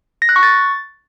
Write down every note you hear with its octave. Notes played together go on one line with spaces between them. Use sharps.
A#6
F#6
C#6
A6